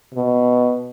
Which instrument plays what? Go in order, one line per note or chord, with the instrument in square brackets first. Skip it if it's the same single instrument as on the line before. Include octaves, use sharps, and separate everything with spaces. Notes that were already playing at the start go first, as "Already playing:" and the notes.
[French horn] B2